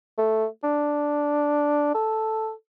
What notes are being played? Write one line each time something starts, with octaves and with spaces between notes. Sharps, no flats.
A3
D4
A4